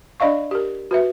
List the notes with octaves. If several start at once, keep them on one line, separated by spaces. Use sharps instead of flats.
D4 D5 D#5 F5 C#6
G4 A#4
F#4 B4 E5